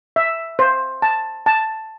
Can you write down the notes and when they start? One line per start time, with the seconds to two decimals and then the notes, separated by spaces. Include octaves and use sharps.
0.16 E5
0.59 C5
1.02 A5
1.46 A5